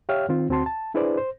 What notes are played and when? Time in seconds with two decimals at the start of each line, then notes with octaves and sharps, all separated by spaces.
0.09 G4 C#5 E5 F5 G5 F6
0.29 D#3 C4 F4
0.49 D2 C4 F#4 A5 C6
0.66 A5
0.94 D4 E4 G#4 B4 C5 D5
1.17 C5